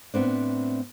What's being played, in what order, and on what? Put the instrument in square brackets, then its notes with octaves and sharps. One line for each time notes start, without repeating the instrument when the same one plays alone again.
[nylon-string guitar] A2 B3 C4 D4